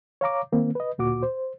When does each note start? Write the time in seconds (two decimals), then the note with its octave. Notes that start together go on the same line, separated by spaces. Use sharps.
0.21 C#5 F5 A#5 D6
0.52 D#3 A#3 C4
0.75 B4 D#5
0.98 D2 A#2 F#4 D6
1.23 C5